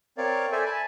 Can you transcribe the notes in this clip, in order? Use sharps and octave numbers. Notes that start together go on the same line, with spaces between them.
C4 A#4 C#5 D5 F5
A4 C5 D5 E5 G#5
G#5 A5 B5